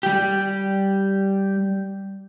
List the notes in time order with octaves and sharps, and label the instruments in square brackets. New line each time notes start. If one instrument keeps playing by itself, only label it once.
[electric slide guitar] G3 G4